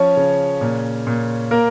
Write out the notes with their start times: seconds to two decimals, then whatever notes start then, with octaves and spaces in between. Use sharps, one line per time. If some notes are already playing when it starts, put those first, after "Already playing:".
Already playing: F3 C#4 C#5
0.17 C#3
0.61 A#2
1.07 A#2
1.51 A#3 A#4